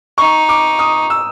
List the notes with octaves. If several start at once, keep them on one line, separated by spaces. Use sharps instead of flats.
D#4 C#6
D6
D#6
E6